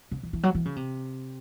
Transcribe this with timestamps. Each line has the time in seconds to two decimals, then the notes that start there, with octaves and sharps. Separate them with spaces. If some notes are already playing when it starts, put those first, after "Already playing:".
0.11 C#3
0.23 E3
0.33 E3
0.43 F#3
0.55 E3
0.65 C#3
0.76 C3